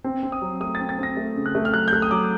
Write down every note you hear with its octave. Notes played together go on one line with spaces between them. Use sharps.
C4
C4
D#6
F#3
A3 D#6
C4 A6
A6
C4 A#6
A3
C#3
F#6
A3
F6
F#3 F#6
G6
A3 F#6
D#6
F#3 D6